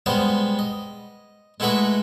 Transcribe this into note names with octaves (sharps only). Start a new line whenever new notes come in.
G3 G#3 B3 C5 D#5
D#5
G#3 A3 E4 F#4 B4 D#5